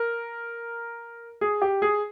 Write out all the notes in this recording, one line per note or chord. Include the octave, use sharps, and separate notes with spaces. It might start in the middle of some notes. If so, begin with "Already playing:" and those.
Already playing: A#4
G#4
G4
G#4